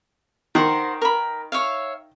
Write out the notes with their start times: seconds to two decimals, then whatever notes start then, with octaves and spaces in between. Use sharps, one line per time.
0.55 D#3 A#4 C5 F#5
1.02 A#4 B5
1.52 C#5 E5 F5